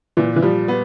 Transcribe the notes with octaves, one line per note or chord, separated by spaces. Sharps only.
A#2 E3
E3
F3 G3
B3